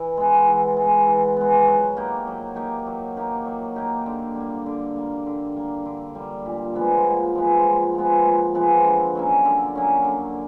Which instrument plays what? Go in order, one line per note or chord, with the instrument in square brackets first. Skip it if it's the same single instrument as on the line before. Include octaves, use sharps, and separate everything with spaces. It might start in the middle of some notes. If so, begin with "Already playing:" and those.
Already playing: [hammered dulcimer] E3
G#3 B3
E3
G#3 B3
E3
G#3 B3
F#3
A#3 D#4 G4
F#3
A#3 D#4 G4
F#3
A#3 D#4 G4
F#3
A#3 D#4 G4
D3
G3 A#3
D3
G3 A#3
D3
G3 A#3
D3
G3 A#3
A#2
F3 G#3 B3
A#2
F3 G#3 B3
A#2
F3 G#3 B3
A#2
F3 G#3 B3
D3
F#3 A#3 C#4
D3
F#3 A#3 C#4
D3